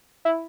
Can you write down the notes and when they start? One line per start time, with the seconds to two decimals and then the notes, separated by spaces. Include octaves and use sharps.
0.25 E4